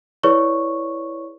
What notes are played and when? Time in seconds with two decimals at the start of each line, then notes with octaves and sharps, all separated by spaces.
0.23 E4 G#4 B4 C#5 D5 C#6